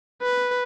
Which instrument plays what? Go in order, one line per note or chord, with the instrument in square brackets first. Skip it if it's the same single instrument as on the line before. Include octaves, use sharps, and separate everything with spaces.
[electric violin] B4